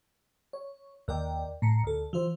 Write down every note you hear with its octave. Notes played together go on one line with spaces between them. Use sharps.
C#5
D#2 A#4 D5 G5
A2 A#5 C#7
D2 A4
E3 F4 C5